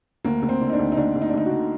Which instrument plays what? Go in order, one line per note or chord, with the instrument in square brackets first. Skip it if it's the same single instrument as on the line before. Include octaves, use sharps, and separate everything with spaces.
[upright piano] D2 A#3
D2
C4
D3
D#4
D4
D2
D#4
D2 D4
D2
D#4
D4
D2 D#4
F#4
D3